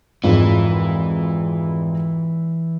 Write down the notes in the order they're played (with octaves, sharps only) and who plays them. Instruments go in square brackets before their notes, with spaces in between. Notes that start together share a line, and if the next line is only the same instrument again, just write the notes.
[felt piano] G#1 F2 G#3 [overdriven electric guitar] E3